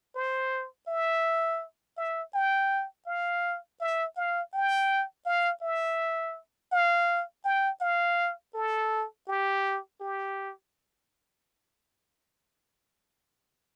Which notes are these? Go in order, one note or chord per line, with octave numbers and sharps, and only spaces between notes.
C5
E5
E5
G5
F5
E5
F5
G5
F5
E5
F5
G5
F5
A4
G4
G4